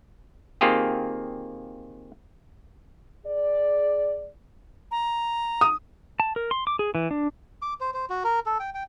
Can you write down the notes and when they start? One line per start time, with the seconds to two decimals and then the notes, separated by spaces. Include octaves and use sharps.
0.61 D#3 A#3 C4 F4 G4 G#4
3.26 G#4 D5
4.91 A#5
5.61 D#6
6.20 A5
6.36 A#4
6.51 C6
6.67 D6
6.79 G#4
6.95 E3
7.11 D4
7.62 D6
7.81 C5
7.94 C5
8.10 F#4
8.24 A#4
8.46 A4
8.60 G5
8.75 G5